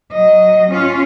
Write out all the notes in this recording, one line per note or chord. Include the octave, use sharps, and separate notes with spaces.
F#3 D#5
C#4 F4